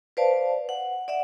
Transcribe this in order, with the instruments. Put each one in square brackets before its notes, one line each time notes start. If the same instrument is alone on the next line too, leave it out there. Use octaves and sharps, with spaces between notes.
[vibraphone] B4 C5 D5 F5 A5
F#5
D5 E5 F#5